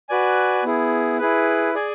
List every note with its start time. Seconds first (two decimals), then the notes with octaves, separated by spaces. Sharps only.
0.09 F#4 B4 D5 G#5
0.64 B3 E4 G#4
1.19 E4 G#4 B4
1.75 G#4 D5 G#5